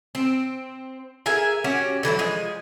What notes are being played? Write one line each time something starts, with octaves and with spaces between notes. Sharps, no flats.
C4
G#4 A#4 E5 G#5
C#4 F#4 G4
D3 E3 F#3 E4
F3 G#3 G#4